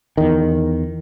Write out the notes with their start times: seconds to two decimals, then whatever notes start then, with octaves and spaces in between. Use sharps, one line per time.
0.17 E2 D#3